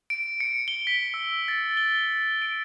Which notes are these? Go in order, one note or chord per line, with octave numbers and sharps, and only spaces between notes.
D7
C#7
G7
B6
E6
A6
G7
D7